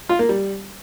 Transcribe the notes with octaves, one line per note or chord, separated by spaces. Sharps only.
F4
A#3
G3